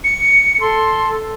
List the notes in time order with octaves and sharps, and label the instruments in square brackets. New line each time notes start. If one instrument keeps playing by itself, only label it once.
[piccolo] C#7
[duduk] A4 [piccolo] C6